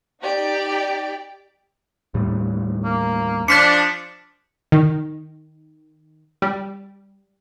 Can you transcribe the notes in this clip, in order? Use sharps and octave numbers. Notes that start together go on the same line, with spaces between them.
D#4 G4 D5
D#2 A2 G3
A#3
F3 D4 G6 B6 C#7
D#3
G3